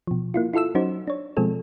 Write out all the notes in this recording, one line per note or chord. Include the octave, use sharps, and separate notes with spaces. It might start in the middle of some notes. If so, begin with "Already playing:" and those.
B2 F3
A#3 E4 F4
E4 F4 A4 E5 E6
F#3 C#4 D#4 F#4 C5
D4 C#5
B2 F3 G#3 C4 G#4 A4